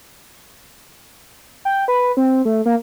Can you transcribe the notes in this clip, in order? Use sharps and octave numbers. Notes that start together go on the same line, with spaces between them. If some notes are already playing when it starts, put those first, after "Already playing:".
G5
B4
C4
A3
A#3